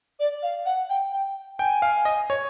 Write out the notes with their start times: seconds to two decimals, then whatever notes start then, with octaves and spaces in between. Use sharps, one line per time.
0.20 D5
0.43 F5
0.66 F#5
0.90 G5
1.12 G5
1.59 G5 G#5
1.82 F5
2.05 D#5
2.30 C#5